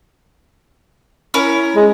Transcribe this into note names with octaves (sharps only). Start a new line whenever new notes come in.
C#4 E4 A#4
G#3